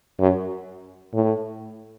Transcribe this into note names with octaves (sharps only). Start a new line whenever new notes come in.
F#2
A2